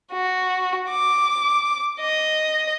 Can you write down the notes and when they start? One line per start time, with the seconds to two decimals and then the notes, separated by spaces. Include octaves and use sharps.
0.13 F#4
0.90 D6
2.01 D#5